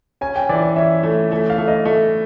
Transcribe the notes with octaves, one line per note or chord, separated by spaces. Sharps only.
C#4 G#5
G5
E3 D5
D5
C#4 E5
A3
A3 E5
F5
A3
D#5
A3